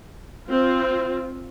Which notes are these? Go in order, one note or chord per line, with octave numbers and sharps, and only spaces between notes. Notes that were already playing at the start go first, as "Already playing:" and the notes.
C4 F4